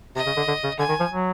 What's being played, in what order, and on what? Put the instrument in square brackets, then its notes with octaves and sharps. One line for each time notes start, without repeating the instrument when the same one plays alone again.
[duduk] C3 [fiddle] D#5
[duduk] C#3
D3
D3
C#3
[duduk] D3 [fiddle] G#5
[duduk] D#3
F3
F#3